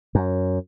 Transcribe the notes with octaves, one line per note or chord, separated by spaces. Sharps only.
F#2